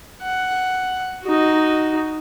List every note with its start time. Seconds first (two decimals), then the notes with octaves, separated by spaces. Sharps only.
0.23 F#5
1.23 D#4 F#4